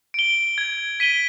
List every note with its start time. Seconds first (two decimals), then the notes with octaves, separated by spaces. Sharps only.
0.14 D7 G7
0.58 G#6
1.00 B6 D#7 G7